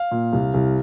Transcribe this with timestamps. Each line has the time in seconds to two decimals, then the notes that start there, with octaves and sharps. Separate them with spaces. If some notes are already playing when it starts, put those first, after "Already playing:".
Already playing: F5
0.11 A#2
0.33 C2
0.54 C2